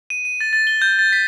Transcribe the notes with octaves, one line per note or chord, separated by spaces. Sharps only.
D#7
D#7
A6
A6
G7
G6
A6
B6